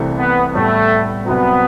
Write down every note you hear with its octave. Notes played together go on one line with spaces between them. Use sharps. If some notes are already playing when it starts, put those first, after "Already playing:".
Already playing: C2 C3 E3 A3
B3
A2 G3 A3 B3
C2 C3 F#3 B3